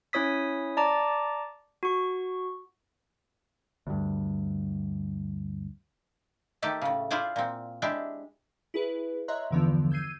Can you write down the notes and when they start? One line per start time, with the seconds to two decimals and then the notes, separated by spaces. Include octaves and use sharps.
0.13 C#4 E4 C#5 D#6 B6
0.77 D5 A5 A#5 D6
1.83 F#4 C#6
3.87 D2 G2
6.62 D#3 A3 G4 A4
6.82 A2 C#3
7.11 E4 F4 G#4 C5 D5
7.36 A#2 C4
7.82 G#3 D4 E4 G4 E5
8.74 E4 G#4 B4
9.28 C#5 D#5 E5 A#5 C6 F#6
9.51 E2 G2 D3 E3 F3 B3
9.91 E6 G6 G#6 C7 D#7